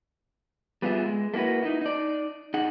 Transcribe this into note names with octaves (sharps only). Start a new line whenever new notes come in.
G3 B3 F4 G#4 E5
G#3
A3 A#3 E4 F#4 B4
D#4 E4
D#4 D5
D#4 G#4 F#5